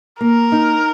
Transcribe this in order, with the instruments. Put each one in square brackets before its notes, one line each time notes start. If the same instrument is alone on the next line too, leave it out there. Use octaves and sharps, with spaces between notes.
[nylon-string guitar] A#3 [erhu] A#4
[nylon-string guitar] D#4